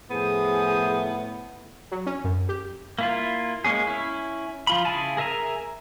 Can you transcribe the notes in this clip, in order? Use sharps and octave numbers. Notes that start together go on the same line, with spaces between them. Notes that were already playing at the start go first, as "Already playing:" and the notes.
A2 F3 B3 G#4 C5 D#6
F#3
C#4
F#2
G4
A#3 E4 F4
G#3 A#3 C#4 G#4
C#4 E4
F3 F4 B5
C#3 E4 G#4 G#5 A5
G#4 A#4 E5 G#5 A#5